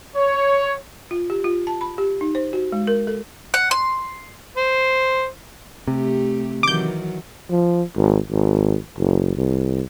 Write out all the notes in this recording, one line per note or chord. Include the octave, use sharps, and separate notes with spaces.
C#5
F4
G4
F4
A5
B5
G4
D#4
C5
F#4
G#3
A#4
A4
F#5
C6
C5
C3 A3 G4
D#3 E3 F#3 D6 G6
F3
G#1
G#1
F#1
C2